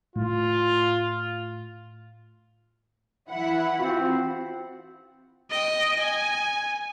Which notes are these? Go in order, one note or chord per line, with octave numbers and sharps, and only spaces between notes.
A2 F4
E3 E4 F#5
C4 F4 F#4
D#5 G5
G#5